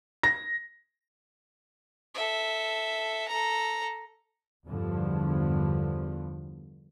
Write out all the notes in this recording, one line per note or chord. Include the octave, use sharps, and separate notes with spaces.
A#6
A4 E5
A4 A#5
E2 G2 D3 F3